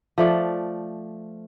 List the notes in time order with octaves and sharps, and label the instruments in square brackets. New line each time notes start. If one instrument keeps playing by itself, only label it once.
[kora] F3 A3 D5